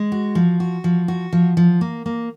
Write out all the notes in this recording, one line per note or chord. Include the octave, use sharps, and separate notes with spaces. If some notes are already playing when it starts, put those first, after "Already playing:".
Already playing: G#3
F#4
F3
F#4
F3
F#4
F3
F3
A#3
A#3